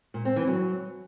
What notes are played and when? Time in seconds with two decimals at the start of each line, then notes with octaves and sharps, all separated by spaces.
0.14 A#2
0.25 C4
0.36 E3
0.47 F#3